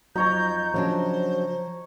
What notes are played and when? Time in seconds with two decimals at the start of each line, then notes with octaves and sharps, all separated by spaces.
0.16 F2 F#3 D#4 C#5 A#5 G6
0.74 C#3 F3 F#3 D4 C5